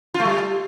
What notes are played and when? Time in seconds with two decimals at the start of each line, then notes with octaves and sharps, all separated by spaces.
0.14 F4
0.20 A3
0.25 G3